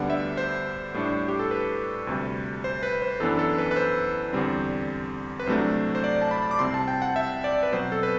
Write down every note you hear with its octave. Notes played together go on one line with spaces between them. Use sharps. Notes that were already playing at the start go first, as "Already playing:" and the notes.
Already playing: D2 D3 G3 B3 D4 F#5
E5
C5
A2 G3 D4
G4
A4
B4
D2 C3 G3
C5
B4
C5
F#2 E3 B3 D4 A4
A4
B4
B4
C5
E2 D3 G3 C4
B4
C2 C3 F#3 A3 D4 C5
C5
D5
A5
B5
D6
C2 C3 G3 C4 C6
A5
G5
F#5
E5
D5
B4
B2 F#3 C4 C5
A4
B4